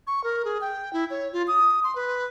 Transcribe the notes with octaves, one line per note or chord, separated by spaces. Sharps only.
C#6
A#4
G#4
G5
E4
C#5
F4
D#6
C6
B4